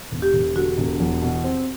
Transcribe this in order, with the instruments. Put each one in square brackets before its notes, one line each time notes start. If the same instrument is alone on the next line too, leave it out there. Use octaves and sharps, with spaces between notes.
[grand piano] E1
[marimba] G4
[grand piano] E1
[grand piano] D3 [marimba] F#4
[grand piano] E1
E2
B2
C4